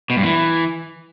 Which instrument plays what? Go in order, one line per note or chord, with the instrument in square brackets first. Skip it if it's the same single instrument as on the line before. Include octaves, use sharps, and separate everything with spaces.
[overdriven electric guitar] B2
G2
E3